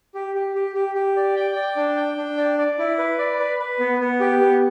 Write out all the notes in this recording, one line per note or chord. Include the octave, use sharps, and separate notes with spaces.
G4
G4
G4
G4
G4
D5
G5
D5
D4
G5
D4
D5
D5
E4
B4
D5
B4
B4
B3
B3
G4
B3